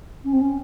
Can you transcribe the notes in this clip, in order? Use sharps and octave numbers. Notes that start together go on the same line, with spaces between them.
C#4
C4
C#4